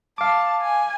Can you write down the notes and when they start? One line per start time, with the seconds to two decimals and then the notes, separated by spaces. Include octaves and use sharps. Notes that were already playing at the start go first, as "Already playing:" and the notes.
0.18 F5 A5 D6
0.61 G#5